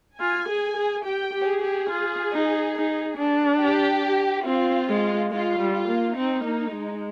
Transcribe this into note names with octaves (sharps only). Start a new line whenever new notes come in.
F4 G#5
G#4
G#4
G4 G5
G4
G#4
G4
F4
D#4
D#4
D4
G4
C4 F4
G#3
G#3 F4
G3
F4
A#3
C4 D#4
A#3
G#3